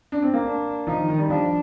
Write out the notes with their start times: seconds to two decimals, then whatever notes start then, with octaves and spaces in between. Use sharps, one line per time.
0.12 D4
0.22 C4
0.34 A#3
0.44 D4
0.87 F3 D#4
0.97 D#3
1.08 D#3
1.18 G3
1.29 F3 D4